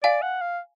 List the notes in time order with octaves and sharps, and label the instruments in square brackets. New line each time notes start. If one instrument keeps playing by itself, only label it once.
[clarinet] D5 [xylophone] F5 G#5
[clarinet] F#5
F5